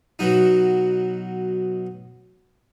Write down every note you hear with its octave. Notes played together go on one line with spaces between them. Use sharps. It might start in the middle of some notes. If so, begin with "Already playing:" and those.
B2 F#3 D#4